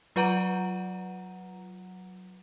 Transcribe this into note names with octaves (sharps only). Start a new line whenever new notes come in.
F#3 F4 B4 F#5 A#5 D#7